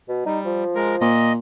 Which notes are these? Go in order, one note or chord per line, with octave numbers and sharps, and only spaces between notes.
B2
G3 D#4
F3
G#3 A#4
A#2 D#5